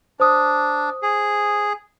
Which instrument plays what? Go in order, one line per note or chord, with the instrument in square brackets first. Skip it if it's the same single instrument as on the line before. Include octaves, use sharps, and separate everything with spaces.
[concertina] D4 [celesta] C5 D#6
[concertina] G#4